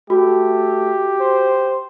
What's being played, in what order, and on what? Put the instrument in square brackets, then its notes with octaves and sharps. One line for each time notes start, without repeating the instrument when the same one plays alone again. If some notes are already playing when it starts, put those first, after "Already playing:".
[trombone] A3 [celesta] F#4 [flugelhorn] G4
[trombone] C5